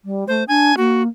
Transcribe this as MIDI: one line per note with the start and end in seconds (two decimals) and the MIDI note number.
0.04 0.27 55
0.28 0.43 57
0.28 0.44 72
0.48 0.76 62
0.48 0.75 80
0.77 1.07 58
0.77 1.02 66